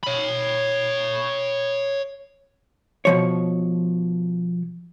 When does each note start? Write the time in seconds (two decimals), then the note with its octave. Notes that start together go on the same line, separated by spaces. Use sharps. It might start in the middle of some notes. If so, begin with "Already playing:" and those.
0.04 C#5 B5
3.05 B2 F3 C#5